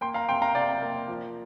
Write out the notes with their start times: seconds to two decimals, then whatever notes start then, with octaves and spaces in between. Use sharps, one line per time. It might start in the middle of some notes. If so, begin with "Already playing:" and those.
0.01 A#3 G5 C6
0.14 F5 A#5
0.28 C3 G5 C6
0.42 F5 A#5
0.55 C3 D5 G5
0.82 A#3
1.08 F3